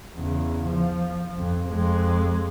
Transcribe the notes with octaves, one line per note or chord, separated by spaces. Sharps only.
E2 C#3
F3
F2
F2 G#3